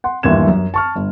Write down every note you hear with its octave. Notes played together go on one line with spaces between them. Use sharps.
F#5 C6
G1 D#2 E3 G#6 E7
F#2
A5 C#6 F6
G1